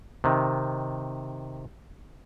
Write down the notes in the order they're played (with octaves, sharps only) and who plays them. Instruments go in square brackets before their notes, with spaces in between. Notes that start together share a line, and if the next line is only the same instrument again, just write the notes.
[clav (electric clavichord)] C3 D#3